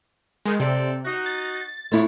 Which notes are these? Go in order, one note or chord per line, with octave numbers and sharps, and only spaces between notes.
D#3 G#3
C3 C4 A4 D5
D#4 F#4
A6
F2 G#2 A3 E4 C#5